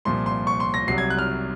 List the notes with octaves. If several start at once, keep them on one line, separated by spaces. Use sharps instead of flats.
C2 A#2 F3 C6
C6
C#6
C6
A#6
C2 C3 F#3 C7
G#6
F#6
F6